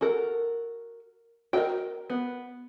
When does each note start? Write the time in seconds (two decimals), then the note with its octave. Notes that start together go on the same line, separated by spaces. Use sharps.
0.01 F#4 A4 A#4
1.53 F#4 A#4 D#5 G5
2.10 B3